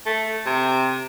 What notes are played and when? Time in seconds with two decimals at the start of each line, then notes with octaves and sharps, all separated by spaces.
0.06 A3
0.46 C3